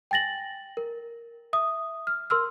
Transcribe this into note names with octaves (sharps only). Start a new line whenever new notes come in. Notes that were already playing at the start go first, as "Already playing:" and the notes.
G5 G#5 A6 A#6 F#7
A#4
E5 D#6
F6
A#4 C6 E6 F6